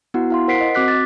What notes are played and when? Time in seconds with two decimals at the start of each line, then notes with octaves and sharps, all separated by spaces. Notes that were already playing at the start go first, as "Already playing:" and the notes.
0.14 B3 E4 F#4 F#5
0.30 E4 F5 C6
0.48 A#4 C5 F#5 B6 C7 D7
0.61 D#5
0.75 C4 F#4 D6 F#6 B6
0.88 D6 A6